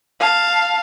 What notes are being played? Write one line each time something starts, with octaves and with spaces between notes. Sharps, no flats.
F5 A5